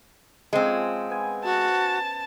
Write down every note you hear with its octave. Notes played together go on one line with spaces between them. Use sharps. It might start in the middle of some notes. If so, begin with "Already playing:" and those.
F3 G#3 C4 C#4
B3 G#5
F#4 A5